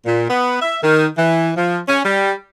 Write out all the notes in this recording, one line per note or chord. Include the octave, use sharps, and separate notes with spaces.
A#2
B3
E5
D#3
E3
F3
C#4
G3